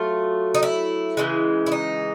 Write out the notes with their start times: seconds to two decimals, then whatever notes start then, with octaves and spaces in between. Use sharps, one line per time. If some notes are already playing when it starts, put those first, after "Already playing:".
Already playing: F#3 A3 F4
0.54 D#4
0.63 E4
1.17 C#3 E3 G#3
1.66 E4
1.72 D#4